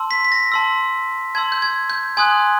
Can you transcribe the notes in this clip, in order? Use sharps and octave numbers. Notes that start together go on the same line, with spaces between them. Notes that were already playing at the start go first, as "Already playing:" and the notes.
Already playing: A5 C6 E6
B6
B6
A#6
A5 C6 E6
A5 C6 E6 G#6
G6
G#6
G6
G#5 C6 D#6 F#6 G#6